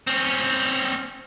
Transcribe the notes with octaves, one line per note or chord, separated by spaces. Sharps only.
C4 C#4